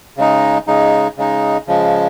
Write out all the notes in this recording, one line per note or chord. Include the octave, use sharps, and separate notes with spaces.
C#3 G#3 D#4
C#3 G#3 D#4
C#3 G#3 D#4
C#3 F3 G#3